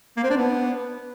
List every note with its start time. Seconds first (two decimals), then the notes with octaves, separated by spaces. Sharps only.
0.17 A#3
0.23 C4
0.30 D4
0.37 B3